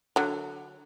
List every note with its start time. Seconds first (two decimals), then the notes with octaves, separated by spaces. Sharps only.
0.16 D3 F#3